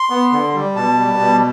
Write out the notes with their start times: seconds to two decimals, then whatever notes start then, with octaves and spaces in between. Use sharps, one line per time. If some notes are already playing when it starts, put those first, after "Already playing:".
Already playing: C6
0.10 B3
0.32 D3
0.54 G3
0.76 B2 A5
0.98 G3
1.19 B2